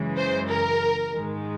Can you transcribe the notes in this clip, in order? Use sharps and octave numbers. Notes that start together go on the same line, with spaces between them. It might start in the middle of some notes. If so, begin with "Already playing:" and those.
Already playing: F#2 C#3 E3 G#3
C5
A#4
G#2 D#3 G#3